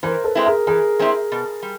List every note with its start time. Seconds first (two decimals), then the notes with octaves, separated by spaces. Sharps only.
0.03 E3 A#4 C5
0.24 A4 B4
0.35 G#3 C4 E4
0.46 G#4 A#4
0.67 E3 G#4 A#4
0.99 G#3 C4 E4
1.32 B2
1.63 G3